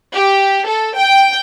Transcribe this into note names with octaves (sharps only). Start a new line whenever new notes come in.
G4
A4
G5